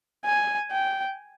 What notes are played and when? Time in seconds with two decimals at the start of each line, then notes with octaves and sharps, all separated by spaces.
0.25 G#5
0.71 G5